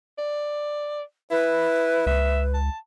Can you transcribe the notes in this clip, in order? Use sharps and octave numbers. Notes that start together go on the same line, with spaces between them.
D5
E4 B4
C#2 E5
A5